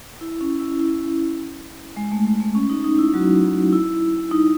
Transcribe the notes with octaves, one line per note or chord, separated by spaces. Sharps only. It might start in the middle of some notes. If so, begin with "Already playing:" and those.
E4
C#4
E4
E4
G#3
A3
G#3
A3
C#4
D#4
D#4
E4
F#3 F#4
E4
D#4